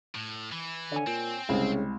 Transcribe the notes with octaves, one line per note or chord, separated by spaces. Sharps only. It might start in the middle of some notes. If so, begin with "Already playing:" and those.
A2
E3
D3 C#5 G#5
A#2 C4
C2 C#3 G#3